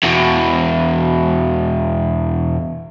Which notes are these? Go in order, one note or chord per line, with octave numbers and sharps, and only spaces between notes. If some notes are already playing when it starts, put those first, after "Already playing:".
E2 B2